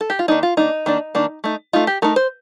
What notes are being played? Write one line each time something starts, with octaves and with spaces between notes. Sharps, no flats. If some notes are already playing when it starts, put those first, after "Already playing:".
A4
G4
F4
D#3 A#3 D4 D#4
F4
D#3 A#3 D4 D#4
D#3 A#3 D4
D#3 A#3 D4
A3 D#4
A3 D#4 F4
G4
A3 D#4 A#4
C5